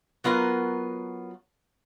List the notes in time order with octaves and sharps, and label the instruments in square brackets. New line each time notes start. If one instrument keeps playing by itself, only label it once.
[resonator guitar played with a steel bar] F#3 B3 F4 A#4